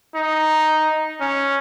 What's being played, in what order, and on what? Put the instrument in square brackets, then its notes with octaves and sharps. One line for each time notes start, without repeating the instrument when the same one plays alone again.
[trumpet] D#4
C#4